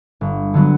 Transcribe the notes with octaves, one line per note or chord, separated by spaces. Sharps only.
G1
D3 F#3 B3